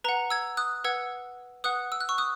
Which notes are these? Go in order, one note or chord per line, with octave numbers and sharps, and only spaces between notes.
B4 F#5 A#5
E6 G#6
D#6 F#6
B4 F#5 E6 G#6
B4 F#5 D#6 F#6
E6
F#6
C#6 E6
D#6 F#6